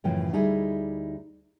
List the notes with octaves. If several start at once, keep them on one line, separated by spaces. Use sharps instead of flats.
F#2 A2 C#3 E3 F3 G5
D2 G3 D#4 E4 G#4